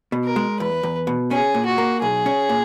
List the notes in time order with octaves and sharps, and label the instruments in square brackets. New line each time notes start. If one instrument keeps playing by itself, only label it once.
[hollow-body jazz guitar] B2
[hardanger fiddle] A#4
[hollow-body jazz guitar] G#3
[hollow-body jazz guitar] E2 [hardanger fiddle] B4
[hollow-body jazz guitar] E2
B2
[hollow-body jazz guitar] C#4 [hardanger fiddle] G#4
[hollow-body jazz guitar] A#2
[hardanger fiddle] F#4
[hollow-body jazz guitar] A#3
[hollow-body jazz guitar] B1 [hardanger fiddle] G#4
[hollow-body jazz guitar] C#4
A#2